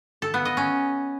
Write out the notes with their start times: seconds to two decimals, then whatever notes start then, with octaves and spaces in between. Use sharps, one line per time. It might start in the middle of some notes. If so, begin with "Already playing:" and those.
0.22 A4
0.34 B3
0.45 D#5
0.57 C#4